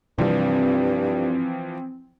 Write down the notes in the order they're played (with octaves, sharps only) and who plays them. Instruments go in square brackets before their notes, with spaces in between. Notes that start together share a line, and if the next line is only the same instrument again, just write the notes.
[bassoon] G2 [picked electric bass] C3 G3 [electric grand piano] E3 F3 [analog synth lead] C4